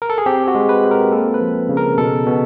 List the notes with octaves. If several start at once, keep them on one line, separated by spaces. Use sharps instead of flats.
A#4
A4
G#4
C4 G4
F#4
G#3
B4
C4
A#4
A#3 A4
B4
F3
C#3
A#4
B2 A4
B2